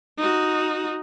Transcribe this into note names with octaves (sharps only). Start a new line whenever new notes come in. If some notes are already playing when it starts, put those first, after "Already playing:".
D#4 F#4